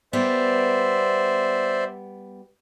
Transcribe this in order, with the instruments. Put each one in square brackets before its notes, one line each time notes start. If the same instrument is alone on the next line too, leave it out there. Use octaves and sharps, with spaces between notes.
[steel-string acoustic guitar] G3 B3 [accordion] C5 D5 E5